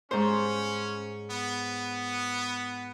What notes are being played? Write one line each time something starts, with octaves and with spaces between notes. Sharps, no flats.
G#2 C#4 C5
B3